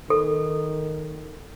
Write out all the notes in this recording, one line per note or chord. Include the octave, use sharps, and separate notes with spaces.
D#3 A4